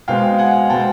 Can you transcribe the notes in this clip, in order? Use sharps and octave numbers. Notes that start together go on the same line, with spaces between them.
B2 G#3 C4 F5 G5
F#5 G#5
B2 G#3 C4 G5 A5